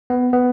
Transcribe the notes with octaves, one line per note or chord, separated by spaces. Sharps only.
B3
B3